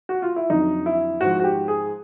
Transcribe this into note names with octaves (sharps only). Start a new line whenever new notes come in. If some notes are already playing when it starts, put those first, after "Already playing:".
F#4
F4
E4
F2 D3 F#3 D#4
E4
G#2 F3 F#4
F#4
G4
G#4